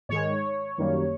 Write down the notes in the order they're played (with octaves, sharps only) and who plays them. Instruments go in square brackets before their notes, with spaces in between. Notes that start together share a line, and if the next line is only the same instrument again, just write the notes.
[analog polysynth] G#2 D#3 G#3 C#5
F#2 D#3 G3 A#3